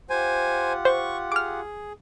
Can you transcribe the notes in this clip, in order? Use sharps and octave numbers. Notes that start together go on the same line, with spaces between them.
F4 G4 C5 F#5 G#5
C5 C#6
G#4 D6 F6